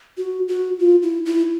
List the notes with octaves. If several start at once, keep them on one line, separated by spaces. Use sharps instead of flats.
F#4
F#4
F4
E4
E4